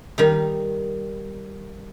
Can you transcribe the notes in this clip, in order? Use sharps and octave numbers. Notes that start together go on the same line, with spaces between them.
D#3 G3 D#4